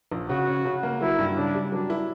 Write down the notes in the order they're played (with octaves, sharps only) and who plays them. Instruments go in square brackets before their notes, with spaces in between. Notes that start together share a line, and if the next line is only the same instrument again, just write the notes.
[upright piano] A#1
[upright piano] C#3 [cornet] F#4
[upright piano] C#4
C#3
A#3
[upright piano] F#3 [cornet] E4
[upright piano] G2
[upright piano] C#3 [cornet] D4
[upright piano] G3
[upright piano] F#3 [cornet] D4
[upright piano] E4